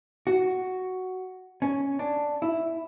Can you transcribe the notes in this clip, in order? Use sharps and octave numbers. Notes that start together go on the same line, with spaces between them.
F#4
C#4
D4
E4